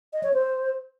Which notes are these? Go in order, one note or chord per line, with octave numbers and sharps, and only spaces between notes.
D#5
C#5
C5